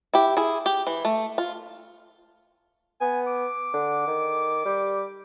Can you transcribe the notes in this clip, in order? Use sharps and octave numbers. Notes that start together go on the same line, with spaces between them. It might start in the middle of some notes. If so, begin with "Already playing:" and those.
E4 G4
E4 G#4
G4
E3
A3
F4
B3 G#5
D6
D3
D#3
G3